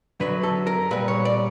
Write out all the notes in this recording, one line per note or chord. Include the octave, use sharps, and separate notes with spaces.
F#2 D3 F#3 B4
A4
A#4
A#2 G3 B4
C#5
D5